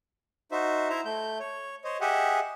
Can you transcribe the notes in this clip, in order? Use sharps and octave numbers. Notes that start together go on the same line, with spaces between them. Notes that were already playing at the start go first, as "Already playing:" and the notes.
D#4 F#4 C5 E5
E4 C5 E5 A#5
A3 G6
C#5
C5 C#5 D#5
G4 G#4 D#5 E5 F#5